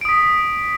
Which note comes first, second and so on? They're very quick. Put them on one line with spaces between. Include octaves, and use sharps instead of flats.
D7 D#6 B6